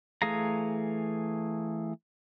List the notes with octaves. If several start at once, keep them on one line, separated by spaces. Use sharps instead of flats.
E3 A3 G#4 F5 A#5